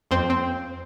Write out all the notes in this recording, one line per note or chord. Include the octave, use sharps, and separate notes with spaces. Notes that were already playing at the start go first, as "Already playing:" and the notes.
F2 C4
C4